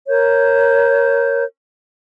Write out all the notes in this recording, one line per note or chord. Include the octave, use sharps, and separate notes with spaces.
A#4 C#5 G6